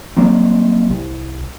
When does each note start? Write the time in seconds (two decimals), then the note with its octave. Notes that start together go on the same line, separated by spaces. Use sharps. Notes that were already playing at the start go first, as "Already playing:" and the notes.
0.17 F#3 G3 A#3 C4
0.90 C2